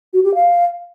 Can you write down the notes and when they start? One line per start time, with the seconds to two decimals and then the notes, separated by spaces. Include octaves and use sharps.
0.13 F#4
0.24 G4
0.35 F5